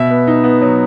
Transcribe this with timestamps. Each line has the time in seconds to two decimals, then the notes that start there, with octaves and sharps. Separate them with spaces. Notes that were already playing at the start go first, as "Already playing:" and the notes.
Already playing: B2 E5
0.10 B3
0.27 D#4
0.44 B3
0.61 F#3